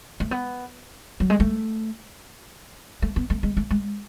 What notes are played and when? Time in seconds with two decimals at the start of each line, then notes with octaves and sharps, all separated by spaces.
0.20 A3
0.31 B3
1.20 F#3
1.30 G#3
1.40 A3
3.02 A3
3.16 B3
3.30 A3
3.43 G#3
3.57 A3
3.71 G#3